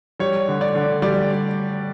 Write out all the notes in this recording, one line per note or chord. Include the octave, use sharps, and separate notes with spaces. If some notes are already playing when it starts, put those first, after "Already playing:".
G3 C#5
D3
D5
D3
G3 D5